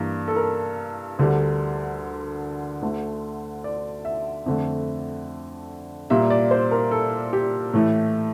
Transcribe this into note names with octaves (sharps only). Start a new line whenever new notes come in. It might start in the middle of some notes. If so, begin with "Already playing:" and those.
Already playing: G2 E3 A#3
A4
A#4
D2 D3 G3
D2 D3 A3
D5
E5
F2 D3 A3
A#2 G3 A#3 E5
D5
C5
A#4
A4
G4
A2 E3 A3